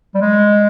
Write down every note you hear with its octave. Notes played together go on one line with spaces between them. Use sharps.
G3
G#3